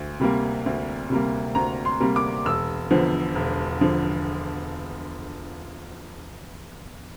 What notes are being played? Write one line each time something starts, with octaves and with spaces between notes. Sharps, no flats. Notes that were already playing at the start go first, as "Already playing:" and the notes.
Already playing: D2
C3 G3 A#3
D2
C3 G3 A#3
D2 A#5
C6
C3 G3 A#3
D6
E1 E6
E2 D3 F3
E1
D3 F3